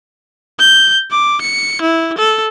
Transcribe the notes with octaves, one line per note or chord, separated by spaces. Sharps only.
G6
D6
C#7
E4
A4